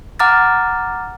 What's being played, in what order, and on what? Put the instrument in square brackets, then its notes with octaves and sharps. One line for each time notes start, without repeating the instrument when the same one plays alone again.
[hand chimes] F#5 A#5 D6 F6 A6